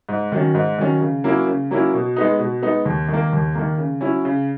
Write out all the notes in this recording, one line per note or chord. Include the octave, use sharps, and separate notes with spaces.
G#2
D#3 F#3 C#4
G#2
D#3 F#3 C#4
C#3
F#3 A#3 C#4 E4
C#3
F#3 A#3 C#4 E4
B2
G#3 B3 D#4
B2
G#3 B3 D#4
D#2
D#3 A#3
D#2
D#3 A#3
C#3
F#3 C#4 E4
C#3